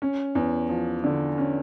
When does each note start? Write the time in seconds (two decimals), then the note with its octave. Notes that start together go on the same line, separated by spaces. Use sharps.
0.02 C#4
0.35 E2
0.69 F3
1.04 D3
1.38 C#4